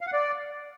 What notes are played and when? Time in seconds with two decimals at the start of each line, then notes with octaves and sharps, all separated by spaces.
0.01 F5
0.07 F#5
0.13 D5